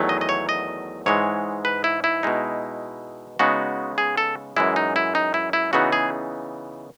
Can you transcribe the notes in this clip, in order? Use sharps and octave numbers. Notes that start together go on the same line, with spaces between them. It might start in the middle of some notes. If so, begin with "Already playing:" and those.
Already playing: E2 D#3 F#3 A3
D#5
D#5
C#5
D#5
G#2 E3 G#3 C#5
B4
E4
E4
B2 G#3 D#4
C#3 G#3 B3 D#4 F#4
G#4
A4
F#2 E3 G#3 E4
D#4
E4
D#4
E4
E4
C#3 E3 B3 D#4 F#4
G#4